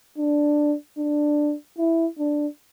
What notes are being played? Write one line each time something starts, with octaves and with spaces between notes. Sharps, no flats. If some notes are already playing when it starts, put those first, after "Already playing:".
D4
D4
E4
D4